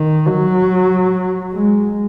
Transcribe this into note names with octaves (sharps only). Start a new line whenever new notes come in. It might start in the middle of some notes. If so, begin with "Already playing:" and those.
Already playing: D#3
F#3
G#3